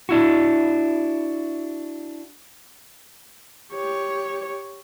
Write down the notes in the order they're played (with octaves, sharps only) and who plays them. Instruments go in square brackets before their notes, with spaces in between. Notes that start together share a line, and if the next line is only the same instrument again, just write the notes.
[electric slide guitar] D4 E4 F#4
[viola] G4 C#5